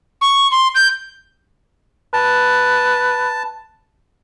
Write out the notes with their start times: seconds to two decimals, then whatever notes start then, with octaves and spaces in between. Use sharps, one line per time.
0.21 C#6
0.51 C6
0.75 G6
2.13 B4 A5